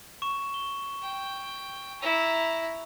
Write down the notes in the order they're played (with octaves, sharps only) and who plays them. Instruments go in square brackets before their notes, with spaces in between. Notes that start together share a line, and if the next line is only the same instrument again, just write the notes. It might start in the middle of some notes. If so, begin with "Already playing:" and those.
[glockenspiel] C#6 E7
G7
[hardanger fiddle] G5
E4 A#5